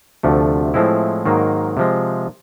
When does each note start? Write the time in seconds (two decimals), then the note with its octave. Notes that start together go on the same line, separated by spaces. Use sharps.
0.23 D2 C3 F3 A3
0.74 A2 F3 G#3 C4 E4
1.26 G#2 D#3 F#3 A#3
1.77 C3 F3 G#3